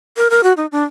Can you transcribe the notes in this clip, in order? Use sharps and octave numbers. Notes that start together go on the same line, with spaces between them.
A#4
A#4
F#4
D#4
D4